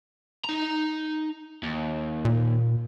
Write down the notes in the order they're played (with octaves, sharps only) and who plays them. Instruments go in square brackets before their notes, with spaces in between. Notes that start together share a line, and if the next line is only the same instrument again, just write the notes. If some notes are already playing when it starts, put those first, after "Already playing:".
[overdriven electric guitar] D#4 A#5
D#2
[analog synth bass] A#2